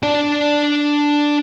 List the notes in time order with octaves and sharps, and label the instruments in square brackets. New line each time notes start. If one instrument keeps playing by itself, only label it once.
[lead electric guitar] D4 D5